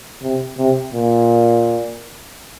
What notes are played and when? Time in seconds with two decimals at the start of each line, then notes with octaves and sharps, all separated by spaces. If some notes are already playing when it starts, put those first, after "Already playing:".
0.23 C3
0.58 C3
0.94 A#2